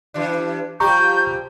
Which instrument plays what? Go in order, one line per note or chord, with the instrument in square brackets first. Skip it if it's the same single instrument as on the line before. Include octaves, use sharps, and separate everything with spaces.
[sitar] E3 G3 D4
[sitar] F3 G3 G4 [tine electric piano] A#5 C#6 [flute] G6